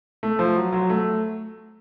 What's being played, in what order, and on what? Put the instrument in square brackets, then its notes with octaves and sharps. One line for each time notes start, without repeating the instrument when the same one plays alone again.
[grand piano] A3
F3
F#3
F#3
A3